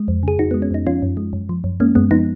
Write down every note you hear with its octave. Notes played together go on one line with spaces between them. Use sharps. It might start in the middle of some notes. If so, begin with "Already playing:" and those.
Already playing: G#3
F2
C#3 G#4
F2 D#4 F#4
G#3 B3
C#4
F2 D#4
F3 C#4 F4
F#2
G#3
F#2
F3
F#2
G#3 A#3 C#4
F#2 G#3 B3
F3 B3 D#4